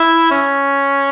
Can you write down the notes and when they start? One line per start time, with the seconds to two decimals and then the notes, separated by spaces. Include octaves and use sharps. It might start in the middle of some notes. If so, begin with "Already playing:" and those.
Already playing: E4
0.31 C#4